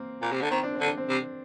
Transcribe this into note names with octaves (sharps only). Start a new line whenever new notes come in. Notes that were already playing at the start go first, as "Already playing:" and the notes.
Already playing: A#3 C4
A#2
C3
D3
D#3 C4
D4
C4
D3
D4
C4
C3